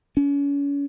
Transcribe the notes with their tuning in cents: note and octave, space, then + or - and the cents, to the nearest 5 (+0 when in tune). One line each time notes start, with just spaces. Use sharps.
C#4 +35